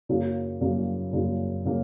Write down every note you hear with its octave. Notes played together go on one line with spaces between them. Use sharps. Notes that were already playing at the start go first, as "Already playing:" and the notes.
F#2 C#3 F#3 A#3
F#2 C#3 F#3 A#3
F#2 C#3 F#3 A#3
C#3 F#3 A#3